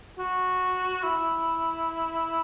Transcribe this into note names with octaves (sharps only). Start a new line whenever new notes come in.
F#4
E4